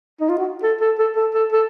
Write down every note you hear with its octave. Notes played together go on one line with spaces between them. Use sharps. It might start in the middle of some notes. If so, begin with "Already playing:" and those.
D#4
F4
F#4
A4
A4
A4
A4
A4
A4